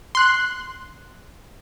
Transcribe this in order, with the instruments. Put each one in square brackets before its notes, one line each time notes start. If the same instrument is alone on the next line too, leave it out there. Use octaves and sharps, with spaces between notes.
[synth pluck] C6 F#6